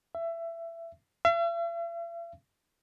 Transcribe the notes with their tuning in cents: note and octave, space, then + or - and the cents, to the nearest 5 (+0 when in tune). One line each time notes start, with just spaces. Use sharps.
E5 +20
E5 +45